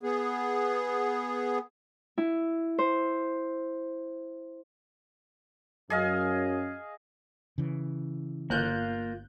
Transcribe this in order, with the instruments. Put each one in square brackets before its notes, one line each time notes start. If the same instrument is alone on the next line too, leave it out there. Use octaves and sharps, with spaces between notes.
[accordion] B3 G#4
[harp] E4
C5
[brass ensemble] F#2 [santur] G#4 D#5 F5
[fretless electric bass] C#3 E3
[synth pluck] G1 F#6 G6 [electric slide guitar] A#3 F4